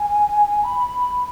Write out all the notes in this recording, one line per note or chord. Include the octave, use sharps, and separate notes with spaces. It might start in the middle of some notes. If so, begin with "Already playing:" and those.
Already playing: G#5
B5